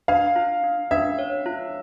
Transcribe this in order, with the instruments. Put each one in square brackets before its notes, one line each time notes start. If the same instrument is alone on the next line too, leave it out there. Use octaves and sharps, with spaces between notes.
[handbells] D4 [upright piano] F5
[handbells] F4
D4
[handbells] D4 [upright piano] E5
[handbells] C#5
F4